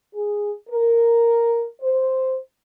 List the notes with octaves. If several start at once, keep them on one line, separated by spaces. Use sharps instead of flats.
G#4
A#4
C5